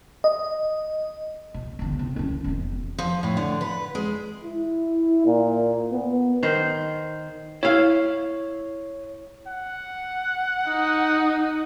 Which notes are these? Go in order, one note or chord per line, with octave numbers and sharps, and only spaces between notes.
D#5
B1
G1 D3
C2
D#3 C#4
E1 F2
F3
A2
D3
B4
G#3
E4
A#2
B3
D#3 C5
E4 C#5 F5
F#5
D#4